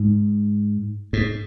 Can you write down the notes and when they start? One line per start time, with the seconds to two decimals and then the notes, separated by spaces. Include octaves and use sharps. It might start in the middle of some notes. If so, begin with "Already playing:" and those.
Already playing: G#2
1.13 G#2